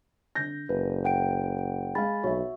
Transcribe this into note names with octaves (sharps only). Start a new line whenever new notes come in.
D3 G6 A#6
F#1 B4
F#5 G5 D7
G#3 F5 G#5 B5 A6
B1 F#4 C#5 E5